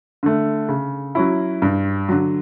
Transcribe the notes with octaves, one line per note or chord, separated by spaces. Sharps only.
D3 A3
C#3
F#3 C#4 E4
G2
D3 F#3